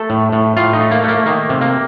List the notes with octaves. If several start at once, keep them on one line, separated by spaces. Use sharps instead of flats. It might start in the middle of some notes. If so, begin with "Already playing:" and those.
Already playing: A3 A4
A2
A2
A2 F4
D#4
A3
A#3
A3 A#3
D#3 A#3
C3
A#3